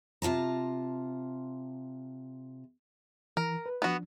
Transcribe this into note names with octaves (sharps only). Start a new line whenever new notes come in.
C3 F4 A5 A#5
E3 A#4
B4
F3 B3 D4 F#4